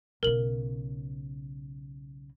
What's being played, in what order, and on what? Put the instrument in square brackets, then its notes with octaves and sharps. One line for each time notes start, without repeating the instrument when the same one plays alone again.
[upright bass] B1 C#3 [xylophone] A#4 F#7